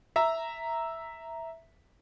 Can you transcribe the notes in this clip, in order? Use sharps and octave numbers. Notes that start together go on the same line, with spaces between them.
E5 A#5